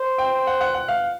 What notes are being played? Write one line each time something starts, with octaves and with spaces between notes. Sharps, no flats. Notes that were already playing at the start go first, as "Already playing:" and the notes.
Already playing: C5
G5
F#5
F#5
F#5
F5